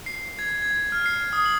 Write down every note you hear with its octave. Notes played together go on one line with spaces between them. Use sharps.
C7
G#6
G#6
F6
C7
D#6
F#7